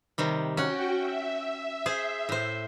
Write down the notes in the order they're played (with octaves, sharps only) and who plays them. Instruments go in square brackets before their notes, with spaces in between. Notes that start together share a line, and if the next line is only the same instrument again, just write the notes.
[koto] C3 D#3 G3
[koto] C#4 F#5 [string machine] F#4 G5
[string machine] E5
[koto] G#4 C5
A2 C5